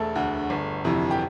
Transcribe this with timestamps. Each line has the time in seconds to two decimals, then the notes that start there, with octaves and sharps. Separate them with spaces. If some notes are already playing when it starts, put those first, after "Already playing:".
Already playing: E1 A3 A4
0.15 D2 D3
0.50 G1
0.84 F2 C3 E3
1.11 G4